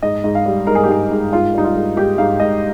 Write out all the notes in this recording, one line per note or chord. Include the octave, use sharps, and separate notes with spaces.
G#2 D#5
G#2
F5
G3
G#2 A#4
G#4
G4
G#2 G#4
G#2
G#2 F4
G3 D#4
F4
G#2
G#2 G4
G#2 F5
G#2 D#5